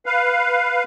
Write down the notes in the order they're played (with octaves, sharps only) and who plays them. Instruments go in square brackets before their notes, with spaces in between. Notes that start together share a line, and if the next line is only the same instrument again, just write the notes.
[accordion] B4 F5